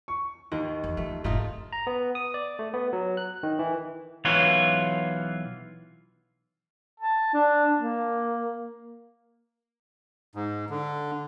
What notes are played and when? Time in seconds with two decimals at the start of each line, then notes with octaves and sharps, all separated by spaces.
0.08 C#6
0.52 D#2 D#3
0.84 E2
0.97 F3 A3
1.24 F1 G#2 A3 D#4 F4
1.73 A#5
1.87 B3
2.15 D#6
2.34 D5
2.59 A3
2.74 B3
2.93 F#3
3.17 F#6
3.43 D#3
3.59 E3
4.25 B1 E3 F4 C#5 F#5
7.00 A5
7.34 D4
7.78 A#3
10.35 G#2
10.70 D3